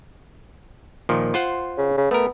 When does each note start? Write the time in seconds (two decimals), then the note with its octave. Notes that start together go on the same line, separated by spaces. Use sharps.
1.09 A#2 D#3 F3
1.34 F4 C5 F#5
1.78 C#3
1.97 C#3
2.11 A3 B3 A#4